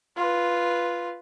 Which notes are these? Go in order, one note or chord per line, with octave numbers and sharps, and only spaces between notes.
F4 B4